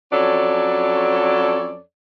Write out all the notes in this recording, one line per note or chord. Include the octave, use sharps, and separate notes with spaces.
F2 F#3 C#4 A4 C#5 D5